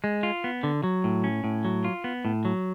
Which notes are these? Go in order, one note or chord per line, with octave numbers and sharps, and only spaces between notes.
G#3
F4
B3
D3
F#3
A2
C#4
A2
F#3
F4
B3
A2
F#3